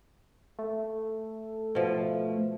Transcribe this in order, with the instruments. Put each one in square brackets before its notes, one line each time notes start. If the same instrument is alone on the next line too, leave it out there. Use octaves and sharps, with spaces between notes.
[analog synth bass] A3
[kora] B2 F3